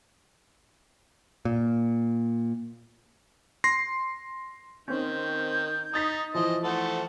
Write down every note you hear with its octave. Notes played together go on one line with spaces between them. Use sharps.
A#2
C6 A#6 C7
D#3 C4 C#4 G6
D#4 D#6 A6 B6
E3 F3 C5 D#5
A3 C5 F#5 A5